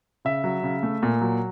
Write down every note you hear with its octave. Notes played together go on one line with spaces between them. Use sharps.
C#3 E5
F#3
C#3
A3
A#2
F#3